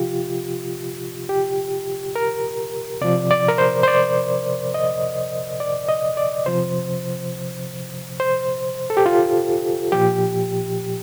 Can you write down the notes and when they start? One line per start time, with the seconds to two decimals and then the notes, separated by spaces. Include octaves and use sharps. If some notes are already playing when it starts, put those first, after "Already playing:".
Already playing: C3 F3 F4 G4
1.29 G4
2.16 A#4
3.01 C3 F3 D5
3.31 D5
3.48 A#4
3.58 C5
3.83 C5
3.88 D5
4.74 D#5
5.60 D5
5.89 D#5
6.17 D5
6.46 C3 F3 C5
8.20 C5
8.90 A4
8.97 G4
9.06 F4
9.92 A#2 F3 G4